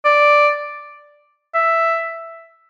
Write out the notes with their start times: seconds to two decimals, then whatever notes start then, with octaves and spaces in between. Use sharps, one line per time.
0.05 D5
1.54 E5